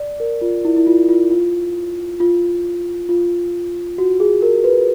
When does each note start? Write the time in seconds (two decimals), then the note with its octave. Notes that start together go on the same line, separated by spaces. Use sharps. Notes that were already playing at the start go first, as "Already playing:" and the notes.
Already playing: D5
0.20 A#4
0.41 F4
0.65 E4
0.77 E4
0.87 F4
1.09 F4
1.31 F4
2.20 F4
3.09 F4
3.98 F#4
4.20 G#4
4.42 A#4
4.64 B4